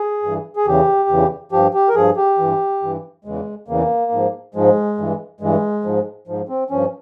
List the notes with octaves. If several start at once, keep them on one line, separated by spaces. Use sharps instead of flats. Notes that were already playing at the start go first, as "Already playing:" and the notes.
Already playing: G#4
G2 E3
G#4
E2 C#3 E3 G4
E2 C#3 E3
G2 F3 G4
G4
A#4
G2 F3 G#4
G4
G2 E3
G2 E3
E2 C#3 E3 G#3
E2 C#3 E3 A#3
G#2 F3
G#2 F3 G#3
G2 E3
G2 E3 G#3
G#2 F3
G#2 F3
C4
G2 F3 C#4